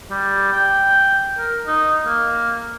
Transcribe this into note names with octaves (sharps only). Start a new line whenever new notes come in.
G3
G5
A#4
D#4
A#3